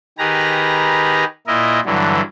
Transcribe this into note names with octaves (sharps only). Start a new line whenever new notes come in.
D#3 G4 G#4 B4 A#5
A#2 E4 A#4 D#5
G2 D3 E3 F#3